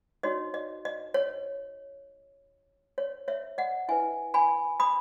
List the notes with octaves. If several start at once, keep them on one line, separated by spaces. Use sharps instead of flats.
D#4 F#4 C#5 D#5
D#5
D#5
C#5
C#5
C#5 E5
D#5 F#5
E4 B4 E5 G#5
G#5 B5
B5 D#6